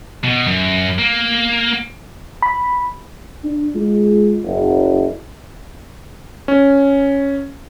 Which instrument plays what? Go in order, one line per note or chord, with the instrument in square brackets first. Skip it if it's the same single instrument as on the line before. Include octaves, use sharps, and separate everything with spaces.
[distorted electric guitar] B2
F#2
A#3
[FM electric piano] B5
[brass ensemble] D4
G#3 F4
F#1
[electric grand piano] C#4